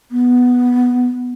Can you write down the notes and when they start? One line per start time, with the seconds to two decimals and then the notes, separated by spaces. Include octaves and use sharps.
0.11 B3